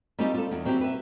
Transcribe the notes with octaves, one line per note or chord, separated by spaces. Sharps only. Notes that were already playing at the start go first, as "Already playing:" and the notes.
G3 C4 C#4 D#4 F4 G4
F4 A4
E2
F#3 C4 C#4 E4 G4
B4 E5